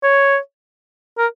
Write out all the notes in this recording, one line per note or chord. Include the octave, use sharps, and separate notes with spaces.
C#5
A#4